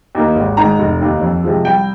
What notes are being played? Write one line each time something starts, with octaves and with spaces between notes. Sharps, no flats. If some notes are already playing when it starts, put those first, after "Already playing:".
D#2 D#3 A#3
G#1
G#2 D#3 A#5
F1
D#2 D#3
F2
C3 F3 G#3
C2 G5